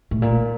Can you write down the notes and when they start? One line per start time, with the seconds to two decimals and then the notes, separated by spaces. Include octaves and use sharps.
0.11 A2
0.22 A#2